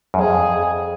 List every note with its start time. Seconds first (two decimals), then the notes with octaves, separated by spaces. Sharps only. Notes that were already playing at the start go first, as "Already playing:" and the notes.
0.14 F#2
0.19 F2 G#4